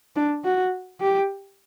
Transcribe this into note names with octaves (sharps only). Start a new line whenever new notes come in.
D4
F#4
G4